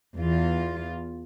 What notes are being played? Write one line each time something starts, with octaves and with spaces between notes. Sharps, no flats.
E2 F4